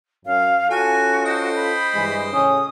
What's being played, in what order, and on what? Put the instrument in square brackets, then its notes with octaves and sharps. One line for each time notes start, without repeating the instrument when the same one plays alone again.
[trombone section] F#2 [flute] F5
[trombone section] C#4 F4 A4 [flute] F#4 [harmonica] G#5
[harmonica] C5 D#5 G5
[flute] B5
[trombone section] G2 E3 G#3
[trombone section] A2 C#3 C#4 [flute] D#6